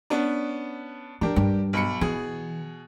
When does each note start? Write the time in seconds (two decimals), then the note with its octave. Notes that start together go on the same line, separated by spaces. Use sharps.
0.10 B3 C#4 D4
1.21 E3 D4 G4 A#4
1.36 G2
1.73 B1 B5 C#7
2.01 B2 E3 G#4